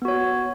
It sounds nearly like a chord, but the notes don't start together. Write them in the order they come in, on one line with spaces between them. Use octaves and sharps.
B3 F#4 C#5